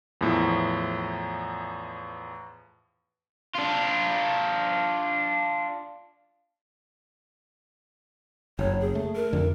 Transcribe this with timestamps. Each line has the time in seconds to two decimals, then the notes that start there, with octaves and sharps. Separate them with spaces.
0.21 E2 A2 F3
3.55 D4 F4
8.59 F#1 C#5
8.81 G#4
8.95 A3
9.16 A#4
9.33 F2 D3